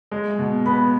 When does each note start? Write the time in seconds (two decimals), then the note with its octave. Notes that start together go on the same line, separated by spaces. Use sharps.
0.11 G#3
0.39 B2
0.66 B3 B5